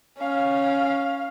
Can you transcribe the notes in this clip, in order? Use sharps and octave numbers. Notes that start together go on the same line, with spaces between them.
C#4 F5